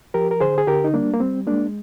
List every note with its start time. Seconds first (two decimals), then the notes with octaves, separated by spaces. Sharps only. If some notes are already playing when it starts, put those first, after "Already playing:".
0.14 F3 G4 A#4
0.31 A#4
0.40 D3 G#4 C5
0.58 G#4
0.67 D3 G4 A#4
0.84 D#4
0.94 G3 A#3 D4
1.14 A#3
1.20 G3 C4
1.47 G#3 A#3 D4